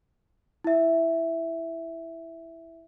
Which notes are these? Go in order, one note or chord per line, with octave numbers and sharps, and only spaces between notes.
E4 E5